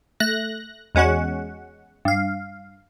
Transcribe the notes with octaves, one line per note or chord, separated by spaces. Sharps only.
A3 F#6 A#6
E2 G#3 C#4 F#4 F#5
G2 F5